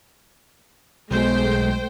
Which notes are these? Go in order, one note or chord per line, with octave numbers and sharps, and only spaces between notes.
B1 G#3 A3 C5 G5